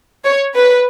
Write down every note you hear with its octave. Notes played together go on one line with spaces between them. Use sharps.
C#5
B4